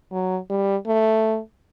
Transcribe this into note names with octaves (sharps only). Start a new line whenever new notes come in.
F#3
G3
A3